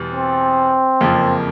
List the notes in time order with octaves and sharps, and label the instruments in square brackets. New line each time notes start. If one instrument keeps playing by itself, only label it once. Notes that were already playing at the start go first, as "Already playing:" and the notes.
Already playing: [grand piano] E2 B2 G3
[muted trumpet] C4
[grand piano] F#1 F2 C#3 F3 A#3